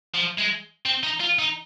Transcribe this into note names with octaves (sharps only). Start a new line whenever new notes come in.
F3
G#3
C4
D#4
F4
D#4